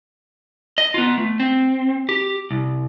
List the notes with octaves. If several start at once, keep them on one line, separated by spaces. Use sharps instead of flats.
D#5
B3 F4
A3
C4
G4
C2